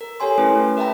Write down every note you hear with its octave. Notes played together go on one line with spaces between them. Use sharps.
A#4
G4 A4 C#5 G#5 C6
A3 C#4 E4 B4
A#4 E5 G5 A5 B5